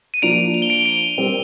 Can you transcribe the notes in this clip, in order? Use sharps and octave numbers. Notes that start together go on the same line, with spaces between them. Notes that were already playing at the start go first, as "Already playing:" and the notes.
D#7
F3 A#3 D4 D7 F7
F7
G7
D7 F7
D7 F7
G3 C4 G4 A#4